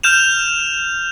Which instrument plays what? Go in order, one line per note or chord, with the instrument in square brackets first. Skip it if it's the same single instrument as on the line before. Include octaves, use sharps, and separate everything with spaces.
[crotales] F6 G6 E7 F7